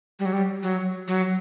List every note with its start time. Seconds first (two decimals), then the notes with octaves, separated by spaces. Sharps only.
0.19 G3
0.26 F#3
0.33 G3
0.63 F#3
1.08 F#3